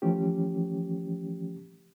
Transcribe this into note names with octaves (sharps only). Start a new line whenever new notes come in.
E3 F3 A3 C#4 G4